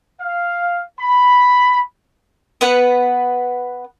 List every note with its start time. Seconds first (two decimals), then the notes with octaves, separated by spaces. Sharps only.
0.21 F5
1.00 B5
2.61 B3 B4 F#5